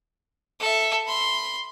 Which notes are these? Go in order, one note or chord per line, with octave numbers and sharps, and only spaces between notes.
A4 E5
B5 C6